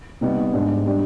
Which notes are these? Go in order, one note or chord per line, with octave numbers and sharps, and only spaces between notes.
C3 G3 B3 D#4
G#2 G3 D4
G3 D4